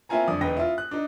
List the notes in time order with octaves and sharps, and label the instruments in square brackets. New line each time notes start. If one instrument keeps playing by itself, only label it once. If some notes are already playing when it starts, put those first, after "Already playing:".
[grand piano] A#3 C4 E4 F4 G#5 A#5
F2 D3 D5 D#6
E1 D#4 B4 G5 A#6
E4 F4
F#6
D4 D#4